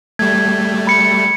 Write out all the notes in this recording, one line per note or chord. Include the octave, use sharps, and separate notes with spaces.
G3 A3 G#6
B5 C#7